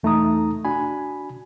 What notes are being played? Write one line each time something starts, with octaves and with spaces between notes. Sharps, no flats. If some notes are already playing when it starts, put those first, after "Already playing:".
E2 A3 D#4 A#5 D#6
D4 F#4 G#5 B5